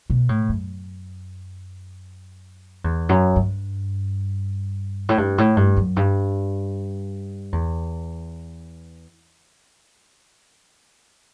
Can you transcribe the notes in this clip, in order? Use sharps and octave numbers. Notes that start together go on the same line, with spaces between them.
B2
A2
F#2
E2
F#2
G2
A2
G2
A2
G2
F#2
G2
E2